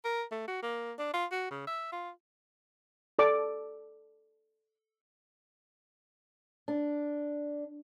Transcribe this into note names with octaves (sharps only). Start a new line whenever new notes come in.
A#4
A3
F#4
A#3
D4
F4
F#4
C#3
E5
F4
A4 D5 D6
D4